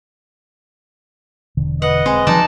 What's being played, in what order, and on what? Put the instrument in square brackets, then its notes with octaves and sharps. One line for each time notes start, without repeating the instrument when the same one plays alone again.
[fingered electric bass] E1 D3
[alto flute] B4 [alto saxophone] D#5 [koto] F#5
[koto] G#3 [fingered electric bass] C4
[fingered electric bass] D#3 F3 F#3 [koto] D#4 D5 A5